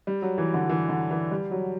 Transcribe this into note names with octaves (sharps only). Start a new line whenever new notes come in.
G3
F#3
E3
D3
E3
D3
E3
G3
F#3